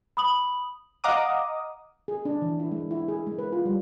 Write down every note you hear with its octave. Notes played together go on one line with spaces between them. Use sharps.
B5 D#6 F#7
D#5 F5 F#5 A#5 D6 D#6
G#4
D4
E3
E4
G#3
E4
G#4
G#3
B4
F4
G3